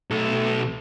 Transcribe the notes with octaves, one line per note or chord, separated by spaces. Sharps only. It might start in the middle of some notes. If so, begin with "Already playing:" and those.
B1 A3 A4